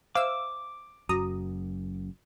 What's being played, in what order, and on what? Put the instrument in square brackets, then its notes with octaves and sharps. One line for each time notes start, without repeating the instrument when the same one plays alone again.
[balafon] C5 E5 [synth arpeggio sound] F5 E6 [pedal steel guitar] D6
[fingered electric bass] F#1 F#2 [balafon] F#4 [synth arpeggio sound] A#5 D#6